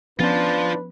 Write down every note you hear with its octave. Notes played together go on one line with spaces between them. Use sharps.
F3 B3 C#4 D4 F4 B4 C5